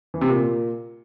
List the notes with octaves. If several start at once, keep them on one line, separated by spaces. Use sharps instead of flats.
E3
C3
A#2